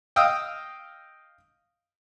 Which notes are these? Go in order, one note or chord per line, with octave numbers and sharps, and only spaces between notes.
D#5 F5 G5 D#6 E6